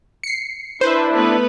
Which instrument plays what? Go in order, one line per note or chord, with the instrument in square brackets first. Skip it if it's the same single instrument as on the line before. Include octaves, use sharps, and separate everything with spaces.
[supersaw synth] C7 C#7
[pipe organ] D4 E4 [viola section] B4 E5 [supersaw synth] C5
[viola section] A3 B3 B4